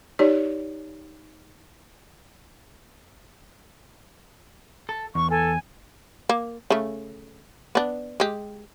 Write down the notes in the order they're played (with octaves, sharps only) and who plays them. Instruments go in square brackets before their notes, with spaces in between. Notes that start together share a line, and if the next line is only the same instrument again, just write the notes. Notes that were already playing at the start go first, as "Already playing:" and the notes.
[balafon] D#4 G4 C#5 D5
[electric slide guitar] A4
[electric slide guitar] E2 [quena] C#6
[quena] A4 [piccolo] G#5
[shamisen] A#3
C#3 A3
B3 D4
G#3 G4